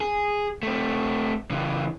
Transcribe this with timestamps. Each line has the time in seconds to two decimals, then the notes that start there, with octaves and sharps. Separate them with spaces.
0.01 G#4
0.63 A3 C4
1.51 C#3 E3